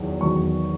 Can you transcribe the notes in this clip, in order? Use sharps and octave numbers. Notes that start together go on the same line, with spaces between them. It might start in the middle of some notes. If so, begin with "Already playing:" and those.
Already playing: E2 D#3 F#3
E2 D#3 F#3 C#6